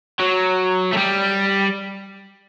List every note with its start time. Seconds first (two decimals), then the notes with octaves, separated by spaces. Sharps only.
0.20 F#3
0.93 A3
0.97 G3